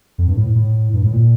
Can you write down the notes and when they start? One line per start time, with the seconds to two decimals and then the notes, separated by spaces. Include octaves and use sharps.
0.18 F2
0.28 G2
0.37 A2
0.55 A2
0.94 G2
1.04 A2
1.13 A#2